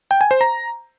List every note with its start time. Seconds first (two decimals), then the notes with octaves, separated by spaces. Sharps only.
0.11 G5
0.21 G#5
0.31 C5
0.41 A#5